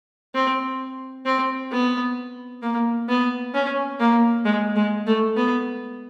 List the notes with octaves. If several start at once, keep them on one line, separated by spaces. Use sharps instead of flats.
C4
C4
B3
A#3
B3
C#4
A#3
G#3
G#3
A3
B3